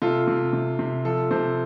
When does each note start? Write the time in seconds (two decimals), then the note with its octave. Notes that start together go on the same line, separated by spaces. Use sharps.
0.02 C3 F4 A4
0.28 C3
0.53 C3
0.79 C3
1.05 F3 F4 A4
1.31 C3 A4 C5